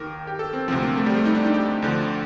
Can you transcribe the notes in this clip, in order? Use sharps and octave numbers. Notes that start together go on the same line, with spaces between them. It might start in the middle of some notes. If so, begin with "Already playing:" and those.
Already playing: D#2 D#3 G4 A#4
G4
A4
C4
D2 C3 F3 C4
A#3
A3
G3
A3
D#4
D4
D#4
G4
D2 D3 F3